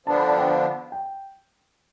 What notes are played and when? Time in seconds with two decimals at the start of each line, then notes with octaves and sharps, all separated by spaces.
0.06 D3 F3 B3 D4 A5
0.17 B5
0.27 A5
0.38 G5
0.49 F5
0.92 G5